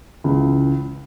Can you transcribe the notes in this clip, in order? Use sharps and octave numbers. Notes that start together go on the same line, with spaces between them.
C#2 C#3 E3